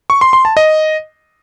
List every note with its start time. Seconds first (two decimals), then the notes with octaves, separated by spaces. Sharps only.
0.10 C#6
0.21 C6
0.33 C6
0.45 A5
0.57 D#5